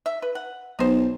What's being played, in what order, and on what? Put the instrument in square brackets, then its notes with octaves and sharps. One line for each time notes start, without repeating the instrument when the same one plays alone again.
[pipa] E5
B4
F#5
[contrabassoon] B1 [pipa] D#4 C5